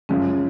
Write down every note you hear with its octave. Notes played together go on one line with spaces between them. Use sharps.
F#2 C#3 F3 G#3 C#4